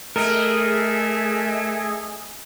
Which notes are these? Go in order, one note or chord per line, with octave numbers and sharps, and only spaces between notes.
A3 G#4 A#4 D#5 E5